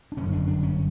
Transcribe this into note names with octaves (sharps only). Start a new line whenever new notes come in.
D4
G1 F#2 C#3 C#4
D4
D4
C#4